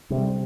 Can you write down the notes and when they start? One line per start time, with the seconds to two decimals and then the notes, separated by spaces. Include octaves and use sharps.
0.10 C3 G3